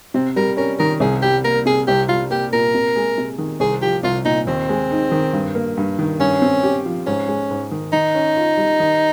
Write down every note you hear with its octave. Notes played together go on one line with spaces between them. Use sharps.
C3 C4
G3 A#4
C#4 A#4
D#3 A#4
C2 G#4
G3 G4
A#3 A#4
C3 G#4
C2 G4
G3 F4
A#3 G4
A#2 A#4
C3
G#3
C3
D#3
C2 G#4
F3 G4
C2 F4
A#2 D#4
D#2 C4
G#3
D#4
D#3
G2
A#3
G2
D#3
G2 C#4
C4
G4
F3
G#2 C#4
G#3
G#2
D#3
D#3 D#4
C#4
F4
G3
D#3